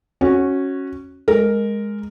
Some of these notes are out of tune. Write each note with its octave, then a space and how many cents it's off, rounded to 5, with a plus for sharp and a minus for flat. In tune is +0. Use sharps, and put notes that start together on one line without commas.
C#4 -10 F#4 +0
G#3 +0 A#4 +0